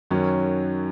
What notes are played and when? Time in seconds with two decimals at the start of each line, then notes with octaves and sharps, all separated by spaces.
0.11 F#2 D#3 F#3 C#4